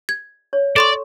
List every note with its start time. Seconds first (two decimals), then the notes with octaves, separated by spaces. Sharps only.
0.09 G#6
0.53 C#5
0.76 A4 D5 C6 C#6